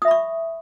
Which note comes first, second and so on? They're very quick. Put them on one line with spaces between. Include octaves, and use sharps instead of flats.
D#6 E5 B5 C#6